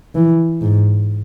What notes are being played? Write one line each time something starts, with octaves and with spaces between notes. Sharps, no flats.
E3
G#2